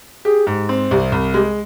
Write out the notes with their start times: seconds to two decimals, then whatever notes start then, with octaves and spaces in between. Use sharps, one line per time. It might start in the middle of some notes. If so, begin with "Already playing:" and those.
0.25 G4 G#4
0.47 G#2
0.69 C4
0.91 C2 G4
1.12 C2
1.34 G#3 G4